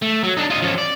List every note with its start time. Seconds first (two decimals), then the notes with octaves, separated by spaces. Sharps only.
0.02 A3
0.24 F#3
0.37 D4 D#4
0.50 F4 D#5
0.62 F3 C#4
0.78 D5